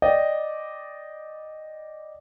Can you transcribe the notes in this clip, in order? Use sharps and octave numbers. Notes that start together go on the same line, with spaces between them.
D5 D#5 G5